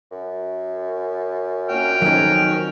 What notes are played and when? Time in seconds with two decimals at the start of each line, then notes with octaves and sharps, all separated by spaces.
0.11 F#2
1.70 A#2 C#4 F#4 G5 F6
2.02 F2 D#3 F#3 C#4